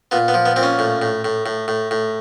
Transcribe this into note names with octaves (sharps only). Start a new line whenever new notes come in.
A#2 B3
B3
F3
B3
A#2 C4
C#4
A2
A2
A2
A2
A2
A2